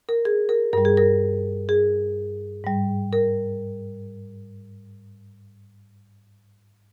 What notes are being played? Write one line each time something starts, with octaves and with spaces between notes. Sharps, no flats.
A#4
G#4
A#4
G2 G3 A#4
G#4
A#4
G#4
G#2 G3
A#4